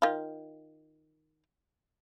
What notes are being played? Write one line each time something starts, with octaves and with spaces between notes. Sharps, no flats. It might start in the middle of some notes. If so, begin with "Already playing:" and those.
D#3 F4